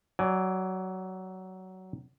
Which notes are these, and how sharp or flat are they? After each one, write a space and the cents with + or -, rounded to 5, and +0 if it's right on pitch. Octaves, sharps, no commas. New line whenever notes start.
F#3 +15 D5 +0 G#5 +5